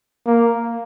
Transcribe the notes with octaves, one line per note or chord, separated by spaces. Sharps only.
A#3